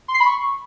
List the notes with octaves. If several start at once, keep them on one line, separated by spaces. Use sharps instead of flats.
C6
C7
B5
C#6